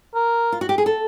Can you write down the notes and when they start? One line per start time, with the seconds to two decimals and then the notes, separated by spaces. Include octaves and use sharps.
0.15 A#4
0.52 F4
0.61 F#4
0.69 G4
0.78 G#4
0.86 A4